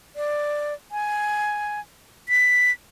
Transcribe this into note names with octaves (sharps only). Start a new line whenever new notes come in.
D5
G#5
B6